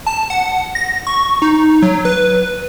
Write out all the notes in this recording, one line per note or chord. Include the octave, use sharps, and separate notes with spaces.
A5
F#5
A#6
C#6
D#4
F#3
B4